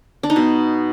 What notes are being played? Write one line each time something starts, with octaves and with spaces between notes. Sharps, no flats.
D4
D#4
B2